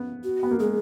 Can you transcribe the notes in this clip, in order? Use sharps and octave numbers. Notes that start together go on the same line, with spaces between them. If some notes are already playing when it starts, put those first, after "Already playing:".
Already playing: B3
F#4
B3
A#3
G#3 G#4